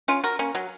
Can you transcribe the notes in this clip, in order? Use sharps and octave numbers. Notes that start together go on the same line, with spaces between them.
C#4 F4
F#4 A#4
A#3 C#4
F#3